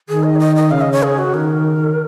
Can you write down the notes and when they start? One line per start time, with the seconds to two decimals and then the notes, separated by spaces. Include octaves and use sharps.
0.08 D#3 G#4
0.24 D#5
0.36 C#5
0.40 D#5
0.56 D#5
0.71 C#3 F5
0.81 D#5
0.92 C#5
1.03 G#4
1.18 F#4
1.34 D#3 A#4